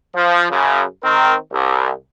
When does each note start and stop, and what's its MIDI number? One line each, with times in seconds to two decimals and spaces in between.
0.15 0.49 53
0.50 0.83 42
0.50 0.83 49
1.03 1.34 51
1.03 1.34 60
1.03 1.34 70
1.52 1.91 36